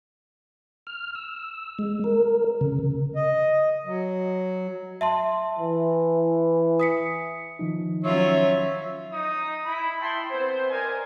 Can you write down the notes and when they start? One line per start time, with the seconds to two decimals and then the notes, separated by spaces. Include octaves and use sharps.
0.87 F6
1.15 E6
1.79 G#3
2.04 A#4
2.61 C#3
3.16 D#5
3.86 F#3
5.01 E5 A5 C6
5.59 E3
6.80 D#6 B6 C#7
7.59 D#3 F3 D#4
8.05 F#3 C#4 F4 C#5 E5
9.12 D#4 D#6
9.65 E4 B5
10.00 E4 G5 A5 B5 C6
10.31 B3 C4 C5
10.70 A#4 D5 D#5 G#5